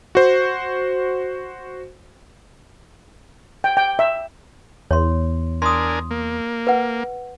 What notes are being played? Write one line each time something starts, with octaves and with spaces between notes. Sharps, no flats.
F#4 C5
G5
G5
E5
E2 C#5 C6
D4 A#4 G#5 C6 D#6
A#3
B4 F#5